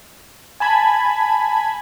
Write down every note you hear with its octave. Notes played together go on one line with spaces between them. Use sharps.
G#5 A5 B5 G#6